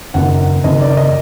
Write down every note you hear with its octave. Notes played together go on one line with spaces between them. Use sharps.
F#1 F#2 D#3 F#5
F#1 F#2 D#3 D#5
D5
D#5